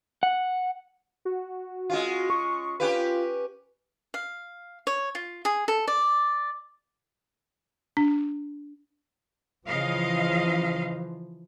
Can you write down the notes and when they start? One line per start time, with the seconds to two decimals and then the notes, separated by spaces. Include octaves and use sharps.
0.23 F#5
1.25 F#4
1.90 G#3 C#4 F4
2.30 C#6
2.80 C#4 F4 G4 B4
4.14 F5
4.87 C#5
5.15 F4
5.45 G#4
5.68 A4
5.88 D5
7.97 D4
9.67 C#3 E3 F3 D#5 F5